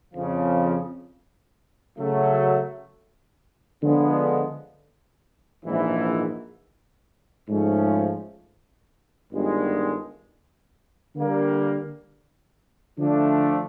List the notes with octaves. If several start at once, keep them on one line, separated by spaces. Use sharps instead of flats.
F2 C#3 F3
C#3 F#3 A3
D3 F3 G#3 B3
A#1 G#2 E3
G#2 F3 A3 C#4
G1 G2 D#3 G#3
D3 G3 A#3
D3 F3 A3 D4